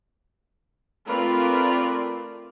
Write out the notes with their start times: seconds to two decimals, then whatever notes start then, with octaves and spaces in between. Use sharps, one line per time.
1.06 A3 C4 F4 A#4 B4 D5